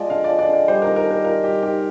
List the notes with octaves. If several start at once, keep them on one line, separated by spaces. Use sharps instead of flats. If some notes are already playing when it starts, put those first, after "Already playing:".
Already playing: F3 G#3 D5 D#5
D3 F5
D5
F3
D5
D3
D5
G3 C5
D#3 A#4
A#4
D4
A#4
F4 A#4
G3 G4
D#3 G4